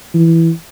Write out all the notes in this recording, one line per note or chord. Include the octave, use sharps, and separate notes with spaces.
E3